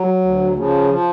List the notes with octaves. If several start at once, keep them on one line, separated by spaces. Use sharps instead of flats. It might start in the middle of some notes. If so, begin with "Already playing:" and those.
Already playing: F#3
D2
C#3 F3
F3